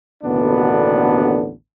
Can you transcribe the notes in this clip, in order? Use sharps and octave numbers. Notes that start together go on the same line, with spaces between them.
A1 D#2 B2 D3 B3 D4